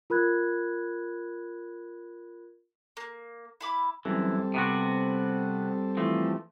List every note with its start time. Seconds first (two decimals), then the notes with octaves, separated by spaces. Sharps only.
0.10 F4 A#4 B5 F#6 G#6
2.97 A#3
3.61 E4 B5 D6
4.05 F#2 E3 G3 C4 A4
4.54 C3 B3 F#4
5.97 E3 F3 A3